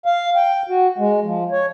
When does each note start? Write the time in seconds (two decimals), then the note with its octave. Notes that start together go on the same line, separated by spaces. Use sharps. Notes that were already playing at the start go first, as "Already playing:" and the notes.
0.06 F5
0.36 G5
0.69 F#4
0.98 G#3
1.24 F3
1.52 C#5